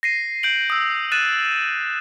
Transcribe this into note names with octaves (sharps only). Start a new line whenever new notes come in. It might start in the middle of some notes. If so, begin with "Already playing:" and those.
A#6 C7 D#7
G6 D7 F#7
D#6 E6
F#6 A6 D#7 E7